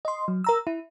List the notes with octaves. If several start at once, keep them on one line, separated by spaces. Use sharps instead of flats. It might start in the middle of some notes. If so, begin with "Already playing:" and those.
D#5 C6
F#3
A#4 A#5 E6
E4